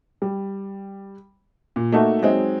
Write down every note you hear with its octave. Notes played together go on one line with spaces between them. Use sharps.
G3
A#2
A3 A#3 D#4 F#4 A4
F#3 G#3 C4 D#4